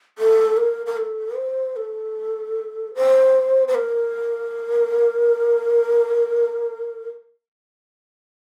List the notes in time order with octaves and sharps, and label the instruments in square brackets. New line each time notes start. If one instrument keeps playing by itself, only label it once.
[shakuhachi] A4
A#4
A#4
A4
C5
A4
C5
C5
A#4